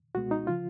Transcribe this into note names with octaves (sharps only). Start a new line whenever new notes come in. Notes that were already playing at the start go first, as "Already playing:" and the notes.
C#2 B2 G#3 B3 F#4
D#4
C#3 F3 F4